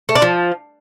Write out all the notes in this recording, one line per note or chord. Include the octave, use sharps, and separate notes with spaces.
A3
D4
F3